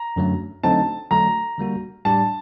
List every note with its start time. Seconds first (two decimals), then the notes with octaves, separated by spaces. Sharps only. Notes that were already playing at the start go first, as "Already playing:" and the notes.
Already playing: A#5
0.16 F#2 D3 F#3 A3
0.63 D3 F#3 A3 C4 D#4 A5
1.11 D3 F#3 A3 D4 A#5
1.58 D3 G3 A#3 F#4
2.05 A2 G3 D4 G4 A5